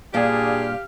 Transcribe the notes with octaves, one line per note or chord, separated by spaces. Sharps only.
G2 A#2 G3 D4 G4 G#4 F5